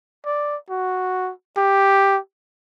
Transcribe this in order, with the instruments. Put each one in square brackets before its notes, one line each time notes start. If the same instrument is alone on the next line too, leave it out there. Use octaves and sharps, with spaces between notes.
[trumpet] D5
F#4
G4